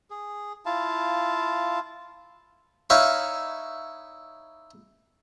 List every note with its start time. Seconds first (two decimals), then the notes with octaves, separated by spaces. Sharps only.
0.10 G#4
0.66 E4 F4 F5 A5
2.90 D#4 E4 C#5 F5 C#6